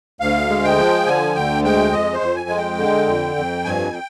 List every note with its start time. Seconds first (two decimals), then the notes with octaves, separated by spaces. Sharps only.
0.20 D2 F5
0.49 G#3
0.64 G5
0.78 F3
1.07 D3 G#5
1.35 D2 G5
1.64 G#3 G5
1.92 F2 D#5
2.13 C5
2.21 F2
2.36 G#5
2.49 G#3
2.57 G5
2.78 D3
3.06 F2
3.36 F2
3.65 G2 G#5
3.93 G5